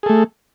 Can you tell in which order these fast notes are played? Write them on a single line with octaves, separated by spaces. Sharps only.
G#4 A4 A3